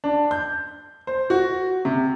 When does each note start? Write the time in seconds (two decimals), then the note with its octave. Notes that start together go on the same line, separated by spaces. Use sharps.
0.04 D4
0.31 G6
1.07 C5
1.30 F#4
1.85 C3